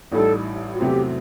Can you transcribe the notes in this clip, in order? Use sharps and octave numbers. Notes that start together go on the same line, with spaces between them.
A1 A2 G3 D#4 A4
F#4
E2 C3 F#3 A3 C4 G4